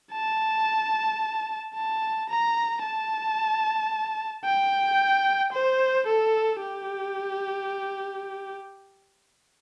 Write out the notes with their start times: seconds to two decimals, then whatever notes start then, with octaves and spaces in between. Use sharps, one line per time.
0.12 A5
1.75 A5
2.29 A#5
2.83 A5
4.45 G5
5.53 C5
6.07 A4
6.60 G4